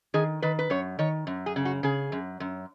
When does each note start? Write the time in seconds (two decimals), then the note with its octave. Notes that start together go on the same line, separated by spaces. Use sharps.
0.14 D#3 G#4
0.42 D#3 B4
0.59 B4
0.70 F#2 C#5
0.99 D#3 C#5
1.27 F#2
1.46 G#4
1.56 C#3
1.65 F#4
1.83 C#3 G#4
2.12 F#2
2.40 F#2